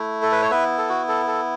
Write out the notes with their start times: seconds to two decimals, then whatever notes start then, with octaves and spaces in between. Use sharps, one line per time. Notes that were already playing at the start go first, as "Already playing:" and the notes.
Already playing: A3 E4
0.22 A4
0.32 B4
0.42 C#5
0.51 B3 E4 B4 E5
0.78 A4
0.89 F#4
1.08 A4
1.28 A4